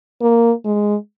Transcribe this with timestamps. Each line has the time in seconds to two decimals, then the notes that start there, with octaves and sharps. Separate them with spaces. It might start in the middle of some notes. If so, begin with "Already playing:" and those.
0.22 A#3
0.65 G#3